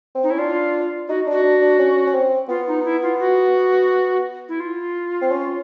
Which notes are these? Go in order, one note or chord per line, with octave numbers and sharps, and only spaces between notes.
C4
D#4
C#4 E4
D4 F4
D#4 F#4
D4 F#4
D4
D4
C#4
C#4
C4
B3 F4
D#4
E4
F4
F#4
E4
F4
C4
C#4